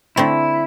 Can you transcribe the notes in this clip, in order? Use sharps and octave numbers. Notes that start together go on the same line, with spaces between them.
D3 A3 C4 E4